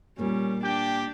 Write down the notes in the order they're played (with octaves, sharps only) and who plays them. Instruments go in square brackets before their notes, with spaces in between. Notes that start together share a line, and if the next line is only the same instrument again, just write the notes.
[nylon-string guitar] A#2 A#3 [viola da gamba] G3 [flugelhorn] C#4
[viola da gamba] D4 [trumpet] G4 [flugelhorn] G5